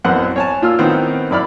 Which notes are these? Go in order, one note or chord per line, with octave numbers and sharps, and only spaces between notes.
A1 F#2 B3 C4 F#5 F#6
C#5 G#5 A5
A#2 F4 E6 F6
A2 D#3 B3 C4 D#4
F#2 E4 D5 B5 F6